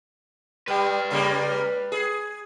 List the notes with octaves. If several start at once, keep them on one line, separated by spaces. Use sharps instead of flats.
G3 B4 G5
C#3 G3 A#3
G#4